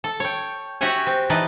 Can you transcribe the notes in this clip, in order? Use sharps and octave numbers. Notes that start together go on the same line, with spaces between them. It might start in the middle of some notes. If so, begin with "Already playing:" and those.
A4
C#5 G5
F#4 G4 C#5 E5 F#5 G#5
C4
E3 D#4 B4 D5 D#5 A5